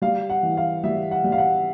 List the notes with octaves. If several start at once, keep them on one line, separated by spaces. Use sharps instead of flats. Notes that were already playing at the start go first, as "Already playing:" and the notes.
G3 F5
F#5
E3
F5
G3 E5
F#5
G3
F5
F#5